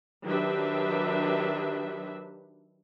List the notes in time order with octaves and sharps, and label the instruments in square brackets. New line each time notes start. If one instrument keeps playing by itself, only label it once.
[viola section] D#3 F#3 D4 G4 B4 E5